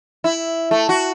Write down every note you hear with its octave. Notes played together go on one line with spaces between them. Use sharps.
E4
A3
F#4